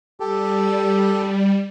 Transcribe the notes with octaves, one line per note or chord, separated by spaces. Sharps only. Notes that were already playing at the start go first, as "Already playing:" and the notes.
G3 G4 A4